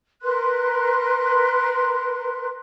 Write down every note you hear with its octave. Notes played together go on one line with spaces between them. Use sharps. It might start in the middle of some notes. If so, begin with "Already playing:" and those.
A#4 B4 C6 F#6